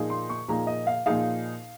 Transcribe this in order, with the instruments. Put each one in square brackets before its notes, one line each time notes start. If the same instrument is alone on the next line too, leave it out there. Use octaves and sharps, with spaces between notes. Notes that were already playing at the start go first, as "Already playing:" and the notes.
Already playing: [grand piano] A#2 F3 A#3 D#4 G#4
[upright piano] C6
C#6
[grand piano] A#2 F3 A#3 D#4 G#4 [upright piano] A#5
[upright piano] D#5
F5
[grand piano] A#2 F3 A#3 D#4 G#4 [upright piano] F5